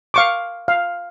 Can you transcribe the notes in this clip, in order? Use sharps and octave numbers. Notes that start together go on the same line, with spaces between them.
F5 C#6 D6
F5